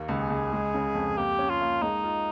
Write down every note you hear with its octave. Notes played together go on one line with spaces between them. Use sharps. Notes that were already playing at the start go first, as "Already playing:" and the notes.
Already playing: D#2 A#3
C#2
G#4
C#2
G#3
C#3
F2
A#3 G4
C#4
F4
A#3
G#3 D#4
F4